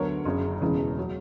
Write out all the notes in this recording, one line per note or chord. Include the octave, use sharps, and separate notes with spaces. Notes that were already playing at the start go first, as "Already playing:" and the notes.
Already playing: D2 D3 F#3 B3 A#4 C#5
F#1 F#2 C#3 F#3
E1 E2 C#3 E3
F#3